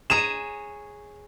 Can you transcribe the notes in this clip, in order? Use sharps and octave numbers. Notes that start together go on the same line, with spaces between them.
G#4 C#5 A#5 D#7 E7